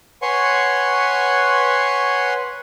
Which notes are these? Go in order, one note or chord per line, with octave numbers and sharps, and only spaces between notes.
B4 C#5 F#5 G#5 C6 C#6